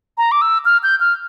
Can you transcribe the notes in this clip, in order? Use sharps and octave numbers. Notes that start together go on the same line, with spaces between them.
A#5
D6
E6
F6
G6
F6